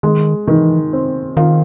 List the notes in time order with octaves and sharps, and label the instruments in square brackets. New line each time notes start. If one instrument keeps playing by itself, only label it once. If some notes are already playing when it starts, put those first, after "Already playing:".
[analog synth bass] D#3 [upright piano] G#3
[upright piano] D#3 [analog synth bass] E3
[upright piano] C4
[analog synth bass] D#3 [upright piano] F4